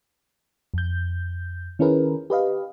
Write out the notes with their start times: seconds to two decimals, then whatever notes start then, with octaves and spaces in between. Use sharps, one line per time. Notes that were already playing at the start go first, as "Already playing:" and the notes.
0.74 F2 G6
1.79 D#3 C#4 E4 G#4 A#4 B4
2.30 G4 B4 D#5 F5